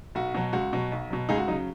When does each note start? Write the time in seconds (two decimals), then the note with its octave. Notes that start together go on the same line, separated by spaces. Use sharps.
0.15 B1 F#4
0.35 B2 F#3
0.53 C#2 F#4
0.73 B2 F#3
0.92 B1
1.10 B2 F#3
1.29 C#2 D#4 G#4
1.38 F#4
1.48 F#3 D#4
1.51 C#3